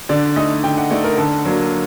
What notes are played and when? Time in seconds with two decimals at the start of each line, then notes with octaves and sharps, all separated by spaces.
0.09 D3 D5
0.36 A3 D#4 D#5
0.64 D3 G5
0.77 F#5
0.91 A3 D#4 D5
1.04 A#4
1.18 D3 A4
1.45 F#3 A#3 D4